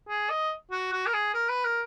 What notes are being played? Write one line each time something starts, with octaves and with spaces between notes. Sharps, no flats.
G#4
D#5
F#4
F#4
A#4
G#4
A#4
B4
A#4